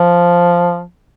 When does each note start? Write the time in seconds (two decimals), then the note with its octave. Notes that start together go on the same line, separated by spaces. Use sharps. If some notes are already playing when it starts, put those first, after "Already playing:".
Already playing: F3